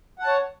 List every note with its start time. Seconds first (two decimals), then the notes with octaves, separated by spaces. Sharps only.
0.19 F#5
0.23 A5
0.27 C#5